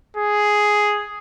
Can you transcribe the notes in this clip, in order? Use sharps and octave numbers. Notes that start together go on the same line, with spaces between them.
G#4